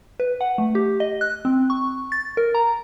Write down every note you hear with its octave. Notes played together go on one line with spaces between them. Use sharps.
B4
F#5
A3
G4
D#5
F#6
C4
C#6
A6
A#4
A#5